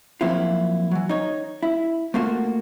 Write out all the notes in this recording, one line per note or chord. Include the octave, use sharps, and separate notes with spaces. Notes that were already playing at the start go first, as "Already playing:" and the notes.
F3 F#3 A#3 C4 E4 F4
E3 F#3
D#4 C#5
E4
A3 A#3 F4 F#4